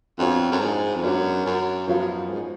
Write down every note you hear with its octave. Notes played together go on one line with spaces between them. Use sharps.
F2 B3 D4 F#4 C#5
F#2
G#2
F2
F#2 B3 D4 F#4 C#5
F#2
F#2 F3 B3 F#4 C#5 F5
G#2